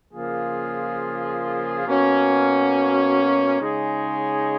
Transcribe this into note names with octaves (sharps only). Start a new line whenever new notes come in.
C#3 F3 A#3 F4 G#4
B2 A#3 C#4 F#4
C#3 G#3 D#4 G#4 C#5